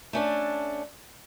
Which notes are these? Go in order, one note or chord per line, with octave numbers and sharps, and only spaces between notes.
A3 C#4 D4